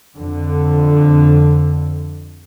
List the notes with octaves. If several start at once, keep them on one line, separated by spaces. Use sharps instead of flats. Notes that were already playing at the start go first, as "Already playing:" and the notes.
F2 D3